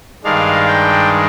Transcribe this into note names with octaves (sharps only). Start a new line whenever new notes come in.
G2 D#3 G#3 D4 F5
G5